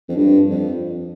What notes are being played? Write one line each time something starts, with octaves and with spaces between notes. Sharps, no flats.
F2
G2
F2